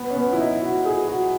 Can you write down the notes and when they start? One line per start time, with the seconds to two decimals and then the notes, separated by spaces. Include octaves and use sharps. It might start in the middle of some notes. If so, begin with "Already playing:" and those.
Already playing: B3
0.10 C#4
0.15 B3
0.33 E4
0.39 D#4
0.62 F#4
0.85 G#4
1.08 F#4